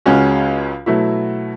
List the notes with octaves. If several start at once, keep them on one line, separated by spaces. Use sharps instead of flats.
C#2 C#3 G#3 C#4 F#4
B2 F#3 A3 E4